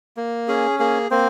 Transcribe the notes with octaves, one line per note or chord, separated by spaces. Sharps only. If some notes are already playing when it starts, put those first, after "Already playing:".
A#3
C#4 G#4
A#3 G#4
A#3 C4 C5